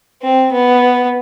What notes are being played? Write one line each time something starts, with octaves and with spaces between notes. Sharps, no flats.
C4
B3